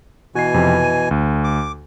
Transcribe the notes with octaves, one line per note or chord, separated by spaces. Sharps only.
B2 E3 F#4 G#5 C7
F2 C3
D#7
D2
D6